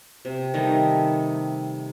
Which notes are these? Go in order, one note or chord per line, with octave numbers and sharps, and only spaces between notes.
C3
D#3 G3 A3 D#4